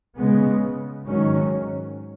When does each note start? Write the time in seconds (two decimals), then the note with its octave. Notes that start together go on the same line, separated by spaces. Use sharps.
0.17 C#3 G#3 B3
1.07 G#2 D#3 F#3 C#4